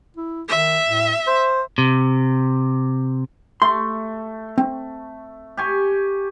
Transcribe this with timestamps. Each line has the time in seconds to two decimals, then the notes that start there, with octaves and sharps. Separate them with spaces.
0.17 E4
0.49 D#3 E5
0.86 A2
1.27 C5
1.78 C3
3.62 A3 C6
4.58 C4
5.57 G4 G#5 C#6